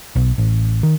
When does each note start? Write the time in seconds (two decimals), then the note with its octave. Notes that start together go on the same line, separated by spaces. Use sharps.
0.16 B1
0.38 A1
0.83 D#3